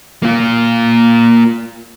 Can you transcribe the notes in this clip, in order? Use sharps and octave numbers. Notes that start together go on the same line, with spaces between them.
A#3 F4